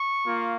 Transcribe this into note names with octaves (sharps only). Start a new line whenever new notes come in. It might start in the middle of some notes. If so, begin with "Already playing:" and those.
Already playing: C#6
A#3 F4